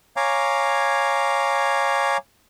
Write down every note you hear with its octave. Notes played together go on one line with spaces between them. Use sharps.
C#5 F5 G#5 A#5 D6